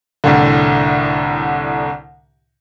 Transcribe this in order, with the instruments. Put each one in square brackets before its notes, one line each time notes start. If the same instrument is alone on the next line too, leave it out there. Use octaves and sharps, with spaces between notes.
[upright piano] C2 A2 D3